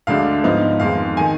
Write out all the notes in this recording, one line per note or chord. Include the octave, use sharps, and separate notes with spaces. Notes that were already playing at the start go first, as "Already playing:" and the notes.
D2 D3 G#3 D4 F5
G#2 F3 B3 D#4
F2 D#3 G#3 F5
D#3 G#5